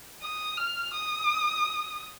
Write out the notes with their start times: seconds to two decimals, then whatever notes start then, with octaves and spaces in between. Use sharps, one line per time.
0.22 D#6
0.57 F6
0.93 D#6